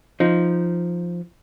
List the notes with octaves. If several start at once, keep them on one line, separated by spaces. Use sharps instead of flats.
F3 D#4